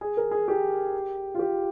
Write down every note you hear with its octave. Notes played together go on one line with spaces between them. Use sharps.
G#4
A#4
G#4
G4
F4
G4